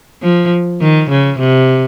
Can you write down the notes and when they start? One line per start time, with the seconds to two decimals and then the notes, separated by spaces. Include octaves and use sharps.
0.22 F3
0.81 D#3
1.10 C#3
1.39 C3